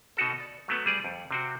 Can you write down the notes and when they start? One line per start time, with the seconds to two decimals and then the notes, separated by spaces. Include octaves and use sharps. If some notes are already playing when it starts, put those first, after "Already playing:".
0.17 B2 D#4 F#4 A4
0.40 D5
0.68 F#3 A3 B3
0.86 G3 G#4 D5
1.05 F2
1.31 C3 C4 F#4